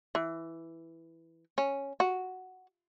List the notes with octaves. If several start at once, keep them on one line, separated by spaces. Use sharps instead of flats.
E3
C#4
F#4